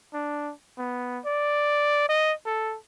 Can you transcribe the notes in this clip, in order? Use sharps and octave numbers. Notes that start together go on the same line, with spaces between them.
D4
B3
D5
D#5
A4